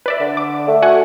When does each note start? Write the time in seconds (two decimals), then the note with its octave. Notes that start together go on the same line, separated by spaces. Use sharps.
0.06 B4 D5 E5
0.20 D3
0.37 D6
0.68 A3
0.82 F#4 F#5 G#5